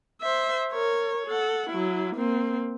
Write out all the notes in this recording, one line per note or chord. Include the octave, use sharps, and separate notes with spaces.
C5 E5
A#4 C#5
A4 F#5
F#3 E4
A#3 C4